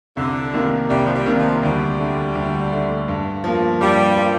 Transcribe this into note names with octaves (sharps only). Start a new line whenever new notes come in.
C2 D3
C3 D#3 A#3
C2 G3
F3
G3
C3 D#3 A#3
F3
D2 G3
D3 A3
D2
D3 A3
G2
F3 A#3
G2 G3
F3 A#3